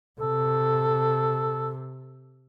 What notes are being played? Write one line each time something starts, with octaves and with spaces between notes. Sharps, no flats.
C3 A4